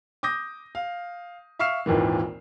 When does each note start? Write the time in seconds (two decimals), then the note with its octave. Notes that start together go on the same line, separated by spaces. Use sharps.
0.23 D6 D#6 G6 A#6
0.75 F5
1.59 E5 F5 C#6 F6 C7 E7
1.86 G#1 D#2 A#2 E3